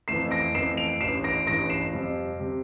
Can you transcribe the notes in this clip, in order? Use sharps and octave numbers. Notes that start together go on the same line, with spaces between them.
F2 E3 A3 C7 E7
A#6 D7
F2 E3 A3 C7 E7
D7 F7
A1 G2 E3 C7 E7
A#6 D7
A1 G2 E3 A#6 D7
C7 E7
F2 C3 G3
C3 G3